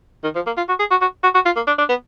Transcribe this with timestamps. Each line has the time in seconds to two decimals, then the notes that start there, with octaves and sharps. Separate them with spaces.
0.24 D#3
0.35 F3
0.46 A#3
0.57 F4
0.69 F#4
0.79 G#4
0.91 F#4
1.01 F#4
1.23 F#4
1.34 F#4
1.46 F4
1.56 A#3
1.67 D4
1.78 D4
1.89 B3